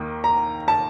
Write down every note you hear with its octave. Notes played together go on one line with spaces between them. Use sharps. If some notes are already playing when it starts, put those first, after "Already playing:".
Already playing: D#2 D#3
A#5
A5